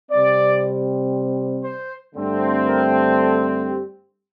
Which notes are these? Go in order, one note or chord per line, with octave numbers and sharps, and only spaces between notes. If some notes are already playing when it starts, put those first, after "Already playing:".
C3 G3 C4 D5
C5
G2 D3 A3 C4
A#4
A4
G4